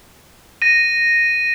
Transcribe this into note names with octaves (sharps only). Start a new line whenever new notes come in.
A#6 D#7